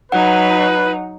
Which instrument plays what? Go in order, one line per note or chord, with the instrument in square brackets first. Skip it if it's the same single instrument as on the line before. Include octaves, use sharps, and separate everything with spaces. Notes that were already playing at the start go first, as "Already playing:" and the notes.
[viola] F#3 D#4 [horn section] B4 [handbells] F#5